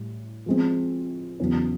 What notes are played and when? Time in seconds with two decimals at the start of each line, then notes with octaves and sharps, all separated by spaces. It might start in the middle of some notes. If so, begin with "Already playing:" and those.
Already playing: A2 G3
0.46 F3 G#3 C4
1.40 E2 C#3 F#3